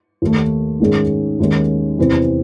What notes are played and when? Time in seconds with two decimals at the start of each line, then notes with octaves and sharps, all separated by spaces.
0.22 D#2 D#3 A3
0.80 G#2 D#3 G#3 C#4 G#4
1.40 D#2 D#3 G#3 C#4
1.99 E2 C3 E3 C4